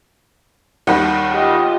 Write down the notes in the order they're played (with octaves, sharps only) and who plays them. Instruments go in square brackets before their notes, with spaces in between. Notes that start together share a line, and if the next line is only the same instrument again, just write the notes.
[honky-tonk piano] D#2 D#3 G3 [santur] F#5
[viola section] F4 D#5 [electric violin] G4